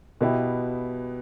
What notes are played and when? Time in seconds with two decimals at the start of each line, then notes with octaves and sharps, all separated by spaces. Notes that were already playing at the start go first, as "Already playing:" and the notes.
0.21 B2 B3 E4 G4